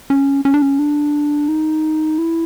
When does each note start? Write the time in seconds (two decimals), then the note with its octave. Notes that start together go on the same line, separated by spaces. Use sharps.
0.10 C#4
0.45 C#4
0.54 D4
0.62 C#4
0.79 D4
1.48 D#4
2.18 E4